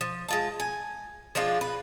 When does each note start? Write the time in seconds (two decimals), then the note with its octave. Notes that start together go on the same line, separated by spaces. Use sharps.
0.01 F3
0.28 G#3 F4 A5
0.60 G#5
1.35 F3 G#3 D4 F4
1.61 B4